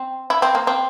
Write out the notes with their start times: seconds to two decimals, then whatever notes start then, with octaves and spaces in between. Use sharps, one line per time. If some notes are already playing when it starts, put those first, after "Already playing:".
Already playing: C4
0.30 E4
0.42 C4
0.55 A#3
0.67 C4